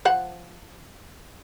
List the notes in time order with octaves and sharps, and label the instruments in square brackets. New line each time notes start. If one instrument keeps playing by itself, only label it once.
[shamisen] F3 C5 F#5